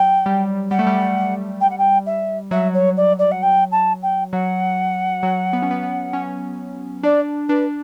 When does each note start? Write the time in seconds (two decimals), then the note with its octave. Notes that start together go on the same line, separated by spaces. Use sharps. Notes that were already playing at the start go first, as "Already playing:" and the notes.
Already playing: F#3 G5
0.26 G3
0.71 G3 F#5
0.79 A3
0.87 G3
1.60 G5
1.70 F#5
1.78 G5
2.06 E5
2.51 F#3 E5
2.74 C#5
2.97 D5
3.19 D5
3.31 F#5
3.42 G5
3.71 A5
4.02 G5
4.32 F#3 F#5
5.23 F#3
5.53 B3
5.62 C#4
5.71 B3
5.83 B3
6.13 C#4
7.03 D4 D5
7.48 D4 B4